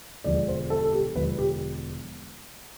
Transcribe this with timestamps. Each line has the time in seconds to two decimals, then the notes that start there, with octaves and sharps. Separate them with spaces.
0.24 E1 E2 D3 F3 D5
0.48 C5
0.70 A4
0.84 A4
0.92 G4
1.15 E1 E2 D3 F3 B4
1.38 G4